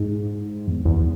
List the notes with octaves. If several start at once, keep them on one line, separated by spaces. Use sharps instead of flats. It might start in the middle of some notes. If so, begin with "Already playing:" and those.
Already playing: G#2
E2
E2